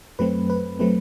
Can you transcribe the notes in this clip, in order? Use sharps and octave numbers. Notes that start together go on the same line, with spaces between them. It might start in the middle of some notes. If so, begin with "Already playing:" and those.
F#2 F#3 A3 C4 B4
B4
F#3 A3 C4 B4